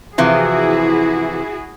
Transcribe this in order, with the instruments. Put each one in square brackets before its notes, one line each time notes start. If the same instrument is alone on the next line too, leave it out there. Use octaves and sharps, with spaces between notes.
[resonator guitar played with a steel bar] C3 E3 F3 [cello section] E4 F#4 G#4